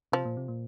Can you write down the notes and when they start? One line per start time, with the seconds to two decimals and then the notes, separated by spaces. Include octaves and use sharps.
0.12 C3 F3
0.25 A#2
0.37 C3
0.48 A#2